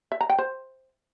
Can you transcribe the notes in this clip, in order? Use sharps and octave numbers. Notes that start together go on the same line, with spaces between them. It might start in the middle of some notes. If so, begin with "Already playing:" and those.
E5
A#5
G5
C5